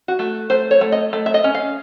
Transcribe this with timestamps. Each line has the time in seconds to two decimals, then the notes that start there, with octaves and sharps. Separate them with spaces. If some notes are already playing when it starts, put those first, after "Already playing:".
0.08 F#4
0.19 A3
0.50 A3 C5
0.71 C#5
0.81 A3
0.92 D#5
1.13 A3
1.26 E5
1.34 D#5
1.44 C#4
1.55 F5